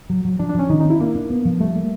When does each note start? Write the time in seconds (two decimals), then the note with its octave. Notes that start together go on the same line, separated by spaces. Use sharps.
0.10 F#3
0.25 F#3
0.39 F3 D4
0.49 D4
0.55 F3 C#4
0.70 D#3 D#4
0.80 D#4
0.84 C4
0.90 E4
1.00 A#3 D4
1.15 D4
1.30 B3
1.45 F3
1.60 G3 A3
1.76 A#3